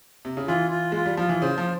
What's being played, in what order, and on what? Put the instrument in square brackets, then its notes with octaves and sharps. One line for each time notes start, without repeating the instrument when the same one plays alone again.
[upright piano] C3
C#3
[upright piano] E3 [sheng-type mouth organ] F4
[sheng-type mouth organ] F4
[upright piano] G#3 [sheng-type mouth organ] F4
[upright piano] G3
[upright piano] F3 [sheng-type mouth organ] F4
[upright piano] E3
[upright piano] C#3 [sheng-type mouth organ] C5
[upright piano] F3